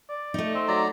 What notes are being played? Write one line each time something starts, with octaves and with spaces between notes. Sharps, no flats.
D5
A3 D#4
C4
F#3 D5 A#5